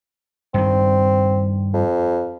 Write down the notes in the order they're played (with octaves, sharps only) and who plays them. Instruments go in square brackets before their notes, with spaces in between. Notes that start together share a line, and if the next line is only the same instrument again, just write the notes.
[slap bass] G2 D#3 [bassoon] C4
[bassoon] F2